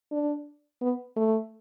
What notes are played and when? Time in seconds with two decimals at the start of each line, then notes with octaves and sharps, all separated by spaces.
0.12 D4
0.81 B3
1.16 A3